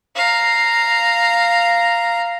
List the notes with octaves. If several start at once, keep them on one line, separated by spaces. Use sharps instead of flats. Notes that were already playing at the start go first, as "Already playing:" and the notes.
F5 A#5